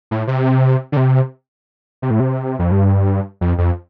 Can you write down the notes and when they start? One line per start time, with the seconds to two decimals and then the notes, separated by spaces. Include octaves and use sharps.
0.11 A2
0.28 C3
0.92 D3
0.97 C3
2.02 C3
2.10 A2
2.20 C3
2.59 F2
2.71 G2
3.41 F2
3.58 F2